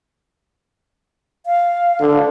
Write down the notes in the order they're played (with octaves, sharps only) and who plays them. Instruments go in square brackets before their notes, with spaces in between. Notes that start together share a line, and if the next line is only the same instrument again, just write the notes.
[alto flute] F5
[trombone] D3